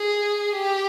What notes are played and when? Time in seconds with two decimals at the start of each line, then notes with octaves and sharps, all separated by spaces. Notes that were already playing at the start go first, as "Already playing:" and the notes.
Already playing: G#4
0.54 G4